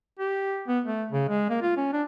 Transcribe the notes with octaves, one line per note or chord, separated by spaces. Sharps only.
G4
B3
A3
C#3
G#3
A#3
F4
C#4
D4